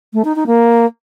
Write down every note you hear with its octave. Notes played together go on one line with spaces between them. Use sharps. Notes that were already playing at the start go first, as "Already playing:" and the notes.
A3
D#4
D#4
A#3